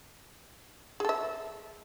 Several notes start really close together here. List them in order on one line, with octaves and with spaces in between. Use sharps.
G#4 A4 E5